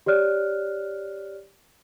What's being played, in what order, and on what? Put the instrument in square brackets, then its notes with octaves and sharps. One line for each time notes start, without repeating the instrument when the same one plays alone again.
[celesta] G4 C#5 D5 F6 F#6